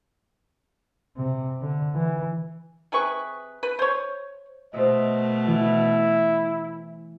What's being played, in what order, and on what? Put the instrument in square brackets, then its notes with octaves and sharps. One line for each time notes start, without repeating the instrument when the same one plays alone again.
[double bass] C3
D3
E3
[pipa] C3 G#4 B4 C#6
B4
C5 C#5
[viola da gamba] B2 A3 [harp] C5 E5 [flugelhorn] D#5
[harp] E3 [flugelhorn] E4